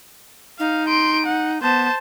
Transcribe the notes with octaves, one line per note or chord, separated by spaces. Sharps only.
D#4 F5
C6 D7
F#5
B3 C5 A5